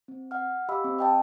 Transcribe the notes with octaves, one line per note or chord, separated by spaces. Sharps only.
C4
F#5 F6
G4 D#5 F5 B5 D6 E6
C4
D#5 G5 A5